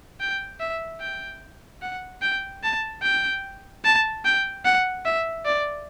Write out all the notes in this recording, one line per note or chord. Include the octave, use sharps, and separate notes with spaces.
G5
E5
G5
F#5
G5
A5
G5
A5
G5
F#5
E5
D5